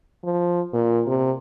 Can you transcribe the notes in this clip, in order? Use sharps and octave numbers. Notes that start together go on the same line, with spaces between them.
F3
A#2
C3